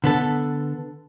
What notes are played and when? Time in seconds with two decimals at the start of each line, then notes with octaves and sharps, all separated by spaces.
0.04 D3 B3 A4